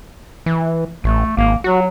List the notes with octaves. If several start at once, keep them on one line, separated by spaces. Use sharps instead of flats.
E3
A1 A3
G#1 A#3
F#3 F#4